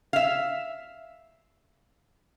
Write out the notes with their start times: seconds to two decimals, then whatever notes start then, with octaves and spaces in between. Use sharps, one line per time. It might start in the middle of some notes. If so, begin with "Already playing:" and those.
0.13 E5 F5